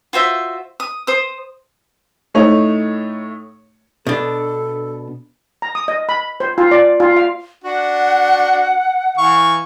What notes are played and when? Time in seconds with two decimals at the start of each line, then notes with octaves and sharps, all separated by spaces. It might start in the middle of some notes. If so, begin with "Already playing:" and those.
0.13 F4 F#4 C5 E5
0.80 D#6
1.07 C5 D#6
2.34 A2 A3 D#4 C#5 F7
4.07 B2 D4 A4
5.62 A#5
5.75 D#6
5.88 D#5
6.09 B5
6.40 C5
6.58 F4
6.71 D5
7.00 F4
7.16 F5
7.64 D4 F#4 F#5
9.18 E3 F5 C#6